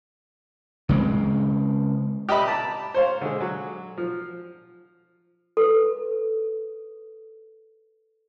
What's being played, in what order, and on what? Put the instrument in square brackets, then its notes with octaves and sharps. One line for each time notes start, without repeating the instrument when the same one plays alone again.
[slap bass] C#3 G#3 C4
[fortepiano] G4 D#5 E5 B5 D6
A5 A#5
C5 C#5 F5
D3 G#3
F#3
F3
[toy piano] A4 B4